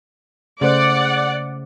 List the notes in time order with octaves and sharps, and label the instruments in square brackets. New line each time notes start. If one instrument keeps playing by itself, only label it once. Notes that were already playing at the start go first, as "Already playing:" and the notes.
[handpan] C#3 A3 C5 [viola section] D5 F#5